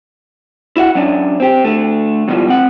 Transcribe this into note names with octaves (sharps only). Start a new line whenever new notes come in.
E4 F#4 F#5
F#3 C#4 D4
C4 G4
D3 A3
F#2 B2 E3 F3 G3
C4 F#5